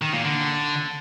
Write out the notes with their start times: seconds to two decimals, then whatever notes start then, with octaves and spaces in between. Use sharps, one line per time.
0.02 D#3
0.13 A#2
0.25 D3